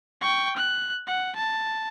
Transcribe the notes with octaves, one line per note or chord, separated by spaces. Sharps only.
G5 C#6
F#6
F#5
A5